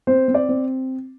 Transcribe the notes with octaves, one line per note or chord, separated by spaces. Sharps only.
C4 C5
C4
D5
C4